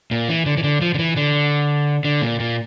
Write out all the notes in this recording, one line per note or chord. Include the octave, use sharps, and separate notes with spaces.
A#2
E3
D3
E3
D3
F3
D3
E3
D3
D3
A#2
A#2